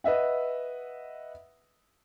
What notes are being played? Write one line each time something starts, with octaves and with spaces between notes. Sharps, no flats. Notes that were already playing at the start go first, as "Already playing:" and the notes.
B4 D#5 E5 F#5